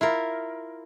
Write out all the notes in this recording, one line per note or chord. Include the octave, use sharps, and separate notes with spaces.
E4 F4 A#4